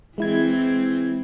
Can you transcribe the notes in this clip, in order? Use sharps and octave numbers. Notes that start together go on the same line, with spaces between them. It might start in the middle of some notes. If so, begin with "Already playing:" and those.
E3 G#3 C4 E4 G#6